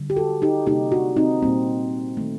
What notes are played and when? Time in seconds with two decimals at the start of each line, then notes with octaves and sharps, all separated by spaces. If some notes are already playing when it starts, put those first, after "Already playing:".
Already playing: D3 G3
0.10 G4
0.16 F#4 A4
0.42 D#4 G4
0.66 C3 G3 A#3 D#4 G4
0.92 D4 F#4
1.17 C4 D#4
1.43 A#2 G3 A#3 C4
2.17 D#3 A3